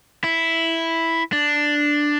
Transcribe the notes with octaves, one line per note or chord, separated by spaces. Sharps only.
E4
D4